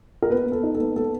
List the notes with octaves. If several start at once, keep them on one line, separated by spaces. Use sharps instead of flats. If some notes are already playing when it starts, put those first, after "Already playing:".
A#4
B3 B4
B3
A4
D#4
A4
B3
B3 A4